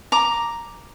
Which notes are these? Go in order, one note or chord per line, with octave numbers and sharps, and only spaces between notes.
A#5 D6